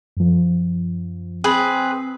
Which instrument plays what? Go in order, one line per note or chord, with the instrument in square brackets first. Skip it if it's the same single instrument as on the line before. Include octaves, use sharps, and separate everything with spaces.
[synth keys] F#2 F3
[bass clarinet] C4 [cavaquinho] G#4 B4